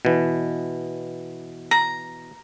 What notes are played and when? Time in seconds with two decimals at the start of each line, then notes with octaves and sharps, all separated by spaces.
0.05 B2 E3
1.71 A#5